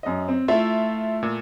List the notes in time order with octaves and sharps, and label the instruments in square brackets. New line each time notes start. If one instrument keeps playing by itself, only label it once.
[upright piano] F#2 D#5
C4
[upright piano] A3 E4 [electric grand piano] F4 E5
[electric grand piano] A#2